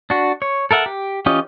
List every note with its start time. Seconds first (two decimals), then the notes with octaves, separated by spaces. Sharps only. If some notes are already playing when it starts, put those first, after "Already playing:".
0.10 D4 F#4
0.42 C#5
0.71 A4 A#4 E5 F#5
0.86 G4
1.26 E3 C#4 F4 G4 D#5